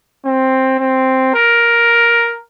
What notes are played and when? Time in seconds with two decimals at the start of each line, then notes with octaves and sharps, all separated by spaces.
0.25 C4
0.79 C4
1.34 A#4